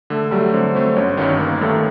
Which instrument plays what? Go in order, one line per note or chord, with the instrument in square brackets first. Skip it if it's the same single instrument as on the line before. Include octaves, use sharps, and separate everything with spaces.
[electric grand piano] D3 [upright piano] A3
[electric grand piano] F#3 A3 [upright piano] G3
[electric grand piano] D3 [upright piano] C4
[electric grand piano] F#3 A3 [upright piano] C4
[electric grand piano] G1 [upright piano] C#4
[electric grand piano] D#3 [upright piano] C#4
[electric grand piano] G2
[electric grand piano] G1 [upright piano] A#3
[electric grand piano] G2 D#3 [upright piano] A3